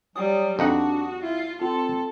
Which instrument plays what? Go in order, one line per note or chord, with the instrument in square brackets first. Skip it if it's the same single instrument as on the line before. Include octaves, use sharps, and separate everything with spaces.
[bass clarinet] F#3 [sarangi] G3 [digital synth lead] D#6
[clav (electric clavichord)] F2 D#4 F#5 [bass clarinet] D4 [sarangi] F#4
[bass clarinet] E4 [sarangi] F4
[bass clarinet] C4 [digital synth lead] F4 [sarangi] A4